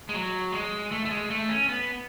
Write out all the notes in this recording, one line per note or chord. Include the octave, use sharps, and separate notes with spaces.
G#3
F#3
G#3
A3
A3
G#3
A3
C#4
B3